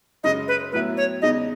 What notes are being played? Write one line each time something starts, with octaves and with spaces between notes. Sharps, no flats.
F#2 C#3 G#3 D#5
B4
A2 F#3 B3 E4 B4
C#5
E2 C#3 G#3 D#4 D#5